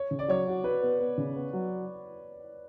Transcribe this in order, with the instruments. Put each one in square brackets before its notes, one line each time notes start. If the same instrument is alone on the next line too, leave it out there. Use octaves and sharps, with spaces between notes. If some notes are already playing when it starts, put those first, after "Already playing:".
Already playing: [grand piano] C#5
[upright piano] C#3
[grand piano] D5
[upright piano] F#3 [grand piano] C#5
[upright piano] F#4
[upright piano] F#4 [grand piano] B4
[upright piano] B3
B3
C#3
B3
F#3